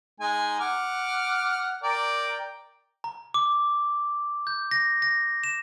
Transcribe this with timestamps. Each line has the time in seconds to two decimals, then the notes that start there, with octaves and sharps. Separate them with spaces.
0.20 G#3 D#4 G#5
0.60 F#5 D6 F6
1.83 A#4 D5 G5
3.04 A#5
3.34 D6
4.47 G6
4.71 A#6
5.02 A#6
5.44 E7